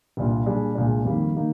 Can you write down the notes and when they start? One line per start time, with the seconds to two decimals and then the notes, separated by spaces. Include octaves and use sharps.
0.17 C2 A#2 G3 D4 F4
0.46 A#2 G3 D4 G#4
0.75 C2 A#2 G#3 D4
1.05 F2 D#3 G3 A#3
1.35 D#3 A#3 D#4